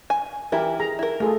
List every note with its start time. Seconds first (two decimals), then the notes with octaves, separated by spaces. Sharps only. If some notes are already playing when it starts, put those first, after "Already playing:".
0.10 G#5
0.52 E3 E4 G4 A#4
0.80 G#4 A#5
0.99 E4 A#4
1.20 A3 F4 G#4 A4